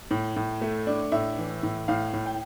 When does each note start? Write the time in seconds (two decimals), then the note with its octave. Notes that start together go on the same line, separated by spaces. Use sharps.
0.11 A2
0.37 A2
0.61 A3
0.87 D4
1.12 A2 E5
1.38 E3
1.63 A2
1.88 A2 F5
2.14 A2
2.26 G5